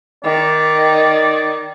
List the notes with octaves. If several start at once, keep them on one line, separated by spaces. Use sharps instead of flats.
D#3 D5